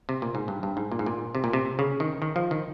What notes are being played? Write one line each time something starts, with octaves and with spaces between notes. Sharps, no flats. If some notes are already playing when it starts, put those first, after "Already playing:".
C3
A#2
G#2
G2
G2
G#2
A#2
G#2
A#2
C3
A#2
C3
C#3
D#3
D#3
F3
D#3